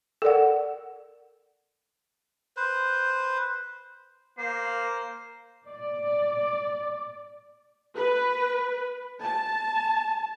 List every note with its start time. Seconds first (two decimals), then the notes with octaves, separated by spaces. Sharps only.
0.22 A4 A#4 D5 F#5
2.57 B4 C5
4.38 A#3 C5
5.69 D5
7.96 B4
9.21 A5